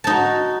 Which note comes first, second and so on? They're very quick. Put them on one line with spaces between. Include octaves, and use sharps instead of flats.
A5 D#4 F#4